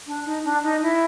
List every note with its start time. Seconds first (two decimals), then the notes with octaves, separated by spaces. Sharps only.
0.07 D4
0.25 D#4
0.45 D4
0.63 D#4
0.83 E4